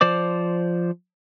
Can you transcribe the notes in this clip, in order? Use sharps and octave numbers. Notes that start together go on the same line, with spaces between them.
F3 C5 D5 D6